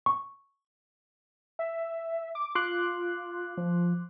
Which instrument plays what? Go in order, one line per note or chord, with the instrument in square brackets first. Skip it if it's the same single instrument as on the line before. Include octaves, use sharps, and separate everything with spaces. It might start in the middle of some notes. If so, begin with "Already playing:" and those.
[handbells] C#6
[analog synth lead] E5
D6
[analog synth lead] F4 [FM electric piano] C6 D6 F#6
[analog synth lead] F3